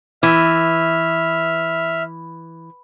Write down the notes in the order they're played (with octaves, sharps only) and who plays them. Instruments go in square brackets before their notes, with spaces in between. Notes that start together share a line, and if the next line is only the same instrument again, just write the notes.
[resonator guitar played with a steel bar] E3 [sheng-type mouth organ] E5 F6